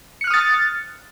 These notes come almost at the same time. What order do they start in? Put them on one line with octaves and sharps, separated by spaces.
C#7 F#6 F6 D#6 A6